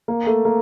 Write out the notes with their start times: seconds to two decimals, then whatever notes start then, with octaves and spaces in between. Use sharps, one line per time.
0.08 A#3
0.27 A3
0.45 A#3